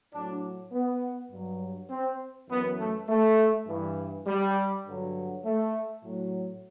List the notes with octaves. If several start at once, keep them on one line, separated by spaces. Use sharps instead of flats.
A2 F#3 D4
B3
G2 F#3
C4
F#2 E3 B3
A3
A3
G2 E3
G3
G2 D3 F#3
A3
A2 F#3